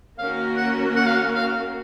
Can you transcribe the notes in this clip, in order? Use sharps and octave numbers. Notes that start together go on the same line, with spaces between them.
D#3 A#3 C#4 F#4 A#4 F5
F#5
F#5
F5
F#5
F5